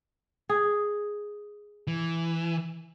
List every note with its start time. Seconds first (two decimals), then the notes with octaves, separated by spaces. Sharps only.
0.49 G#4
1.87 E3